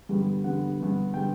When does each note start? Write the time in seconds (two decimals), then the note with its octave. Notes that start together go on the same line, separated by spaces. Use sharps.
0.09 G2 D3 G3 B3
0.44 G2 D3 G3 B3 F#5
0.80 G2 D3 G3 B3
1.14 D3 G3 B3 G5